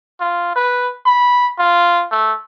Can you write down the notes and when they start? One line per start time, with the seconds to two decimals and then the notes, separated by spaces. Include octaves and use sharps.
0.20 F4
0.56 B4
1.06 B5
1.59 F4
2.11 A3